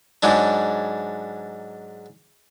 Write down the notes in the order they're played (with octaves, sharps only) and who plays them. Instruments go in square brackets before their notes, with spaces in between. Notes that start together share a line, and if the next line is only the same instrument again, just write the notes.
[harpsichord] G#2 F#3 G#3 D4